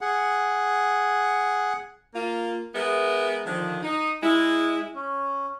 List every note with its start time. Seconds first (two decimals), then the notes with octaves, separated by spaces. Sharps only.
0.01 G#4 F#5
2.15 A#3 F4
2.74 G#3 B3 A#4 E5
3.47 D3 D#3 F3
3.83 D#4
4.23 G#3 E4
4.95 C#4